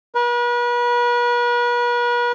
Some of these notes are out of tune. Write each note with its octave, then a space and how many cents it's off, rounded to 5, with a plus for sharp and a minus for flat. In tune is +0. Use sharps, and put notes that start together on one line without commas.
B4 -40